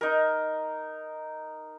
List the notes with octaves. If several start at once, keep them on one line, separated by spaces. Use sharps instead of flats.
D#4 A#4